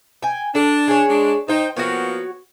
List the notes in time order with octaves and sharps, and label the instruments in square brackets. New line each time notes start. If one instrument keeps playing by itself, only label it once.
[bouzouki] G5 G#5
[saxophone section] D4 [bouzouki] A4
[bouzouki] G#4 C#5
[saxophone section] G#3 D4
[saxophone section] D#4 [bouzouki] C5 G5
[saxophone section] F3 A#3 B3 [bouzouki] F#4 C#5